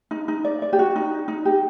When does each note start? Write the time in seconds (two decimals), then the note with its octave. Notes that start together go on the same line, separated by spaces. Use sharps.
0.11 D#4
0.28 D#4
0.45 D5
0.62 D5
0.73 G4
0.79 F#4
0.96 D#4
1.28 D#4
1.45 G4